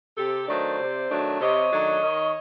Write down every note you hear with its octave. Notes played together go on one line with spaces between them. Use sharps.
C3 G4 A4
D#3 F#3 A3 D4 C5 D5
C3
D#3 F#3 A3 D4
C3 C#5 D#5
D#3 F#3 A3 D4
D#3